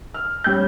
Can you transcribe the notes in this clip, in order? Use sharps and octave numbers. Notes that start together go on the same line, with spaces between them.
F6
G3 C#4 G6